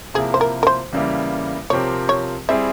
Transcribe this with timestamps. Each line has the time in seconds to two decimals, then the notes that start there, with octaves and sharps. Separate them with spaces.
0.14 C3 F3 A#3 E4 G#4
0.34 C5
0.41 A#4
0.63 A#4
0.67 C5
0.93 E2 C#3 G3 A#3 E4
1.70 C3 F3 C4 G4 A#4 C#5
2.09 C#5
2.49 G3 C4 E4 G#4 E5